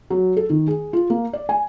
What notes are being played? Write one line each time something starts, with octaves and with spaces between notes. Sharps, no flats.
F#3
A4
D#3
G#4
F4
A#3
D5
G#5